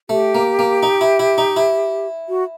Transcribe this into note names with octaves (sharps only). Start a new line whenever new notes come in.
A3 G4
A#3
A#3
D#4
E4
E4
D#4
E4
F#4